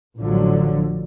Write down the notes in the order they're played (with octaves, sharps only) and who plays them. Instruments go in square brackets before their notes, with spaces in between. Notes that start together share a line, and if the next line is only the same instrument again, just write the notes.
[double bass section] A1 G#2 D3 F3 F#3